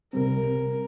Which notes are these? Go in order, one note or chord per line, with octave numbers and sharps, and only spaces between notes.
C2 C3 G3 C4 A#4